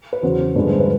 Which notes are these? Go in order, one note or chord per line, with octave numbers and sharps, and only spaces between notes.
B4
E2 C#3 F#3 C5
G2 D3 F3 G#3 B4
C5
B4